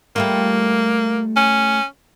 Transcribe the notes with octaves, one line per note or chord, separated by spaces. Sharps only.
G3 A3 A#3 F4
C#4